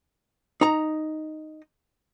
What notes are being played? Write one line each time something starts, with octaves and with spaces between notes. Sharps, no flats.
D#4 A#5